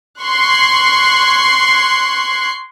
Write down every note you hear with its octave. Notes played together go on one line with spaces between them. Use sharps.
C6 C#6 F#6 G#6 C7